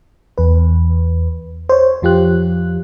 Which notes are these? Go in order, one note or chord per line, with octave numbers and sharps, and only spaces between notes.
E2 B4
C5 C#5
F2 F3 F4 G4 F#6